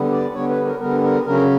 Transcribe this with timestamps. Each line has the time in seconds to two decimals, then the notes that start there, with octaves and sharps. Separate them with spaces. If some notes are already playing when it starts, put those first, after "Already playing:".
Already playing: D3 G3 B3
0.12 D5
0.34 D3 G3 B3 C#5
0.49 B4
0.65 A#4
0.80 D3 G3 B3 A#4
1.03 A#4
1.26 C#3 F#3 C#4 A#4